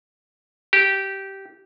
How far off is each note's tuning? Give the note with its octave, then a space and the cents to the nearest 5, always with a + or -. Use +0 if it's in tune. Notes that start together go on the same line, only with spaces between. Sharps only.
G4 -15